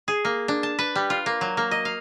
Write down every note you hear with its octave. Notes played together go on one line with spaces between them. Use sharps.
G#4
A#3
D4
A5
B4
G3
F4
A#3
F#3
A#3
D#5
F5